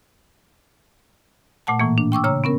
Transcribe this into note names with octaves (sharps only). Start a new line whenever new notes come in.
A#2 A3 F#5 A5
A2 E3 A#3
D4
G5 C#6 D6 E6
C#3 C#5 A#5 E6
B3 C#4 A#4